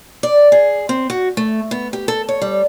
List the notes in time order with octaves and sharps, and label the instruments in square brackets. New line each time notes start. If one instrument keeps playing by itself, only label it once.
[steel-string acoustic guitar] D5
G#4
C4
F#4
A3
B3
G4
A4
C#5
G3